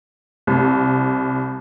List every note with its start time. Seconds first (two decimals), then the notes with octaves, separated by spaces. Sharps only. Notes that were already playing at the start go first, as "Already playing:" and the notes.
0.47 C2